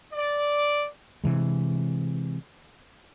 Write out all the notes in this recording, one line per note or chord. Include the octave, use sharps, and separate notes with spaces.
D5
C3 E3 G#3